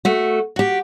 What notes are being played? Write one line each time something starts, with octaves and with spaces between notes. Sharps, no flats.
A3 F#4
F#4 G4